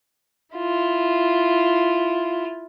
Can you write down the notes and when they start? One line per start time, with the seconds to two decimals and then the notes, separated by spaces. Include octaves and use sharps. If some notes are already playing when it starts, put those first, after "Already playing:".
0.56 E4 F4